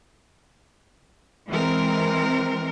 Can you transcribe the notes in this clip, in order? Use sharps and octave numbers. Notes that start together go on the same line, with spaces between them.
E3 G#3 C4 A#4